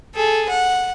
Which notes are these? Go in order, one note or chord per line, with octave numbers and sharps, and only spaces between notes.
G#4 A4
F#5